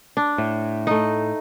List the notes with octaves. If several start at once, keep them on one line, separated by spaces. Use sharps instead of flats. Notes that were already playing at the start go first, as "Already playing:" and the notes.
D4
A2
A3 D#4